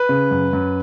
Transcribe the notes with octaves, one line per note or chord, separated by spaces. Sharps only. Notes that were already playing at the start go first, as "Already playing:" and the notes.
Already playing: B4
C#3
F#2
F#2